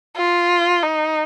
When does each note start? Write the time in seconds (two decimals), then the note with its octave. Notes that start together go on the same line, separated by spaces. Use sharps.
0.17 F4
0.83 D#4